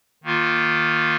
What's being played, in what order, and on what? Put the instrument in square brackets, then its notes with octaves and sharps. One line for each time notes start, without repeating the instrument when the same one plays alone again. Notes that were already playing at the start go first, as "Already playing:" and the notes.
[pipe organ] D#3 A#3 F4